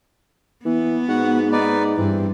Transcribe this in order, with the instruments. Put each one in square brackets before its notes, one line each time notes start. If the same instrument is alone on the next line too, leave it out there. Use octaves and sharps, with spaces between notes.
[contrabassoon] E3 [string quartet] B3
[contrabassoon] G#2 [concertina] F#4 F#5
[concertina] D#4 B4 D5
[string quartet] G2 [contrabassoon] E3 [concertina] C4